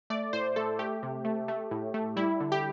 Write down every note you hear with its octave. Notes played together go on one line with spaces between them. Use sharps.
A3 D5
A2 C5
A3 A4
A3 G4
C3
A3
A3
A2
A3
G3 E4
D3
G4